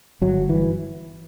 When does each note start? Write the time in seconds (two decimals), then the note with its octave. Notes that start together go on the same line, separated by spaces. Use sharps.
0.21 G1 F#3
0.49 E3